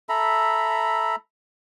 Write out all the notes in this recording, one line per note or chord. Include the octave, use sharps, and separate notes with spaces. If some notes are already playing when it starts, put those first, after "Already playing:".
A4 E5 A#5 B5